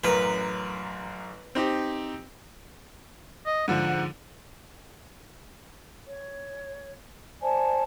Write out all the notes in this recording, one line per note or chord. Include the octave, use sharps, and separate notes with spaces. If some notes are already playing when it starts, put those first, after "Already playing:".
A1 F#2 A#4 B4
C4 D#4 G4
D#5
G#2 D3 F3 F#5
C#5
C5 D5 G#5 A5